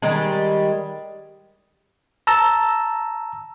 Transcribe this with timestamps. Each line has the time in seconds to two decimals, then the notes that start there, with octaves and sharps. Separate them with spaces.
0.02 D#3 G3 G#3
2.27 A5 A#5 E6